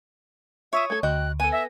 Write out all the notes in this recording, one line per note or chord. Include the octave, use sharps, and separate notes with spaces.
F4 C#5 E5 C#6 D#6
A3 A4 G#6
D2 F#4 D#5 G5 F#6
B3 A4 G#5 D#7
E5 A#6